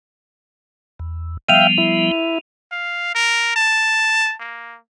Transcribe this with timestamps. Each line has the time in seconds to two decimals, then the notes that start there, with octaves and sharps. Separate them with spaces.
1.00 E2
1.49 F3 G3 B3 E5 F5 G5 D#7 F7
1.78 E4
2.72 F5
3.15 A#4
3.56 A5
4.40 A#3